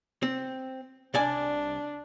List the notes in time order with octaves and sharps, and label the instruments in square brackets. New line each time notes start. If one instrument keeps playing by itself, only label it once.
[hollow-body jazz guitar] C4
[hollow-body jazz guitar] C2 D5 G#5 [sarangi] D4